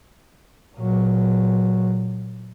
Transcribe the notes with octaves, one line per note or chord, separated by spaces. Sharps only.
A#2 F#3